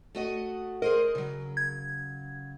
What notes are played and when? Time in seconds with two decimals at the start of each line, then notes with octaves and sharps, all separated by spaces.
0.15 A3 F#4 D#5
0.82 G#4 A#4 C5 D#5
1.15 C#3 F#3
1.57 G#6